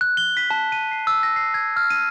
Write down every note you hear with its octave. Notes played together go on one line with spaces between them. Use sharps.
F#6
G7
B6
A5
D#7
C7
E6
A#6
C7
G#6
F6
D#7